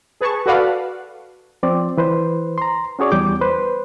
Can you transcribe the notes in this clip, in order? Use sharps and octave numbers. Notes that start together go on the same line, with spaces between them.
G#4 B4 A5 C#6
F#4 A4 B4 D5 F5 F#5
F3 C4 D5
E3 B4 C5
A#5 C6
C#4 F#4 G#4 C#5 D5
E2 G3 D6 G6
B4 C5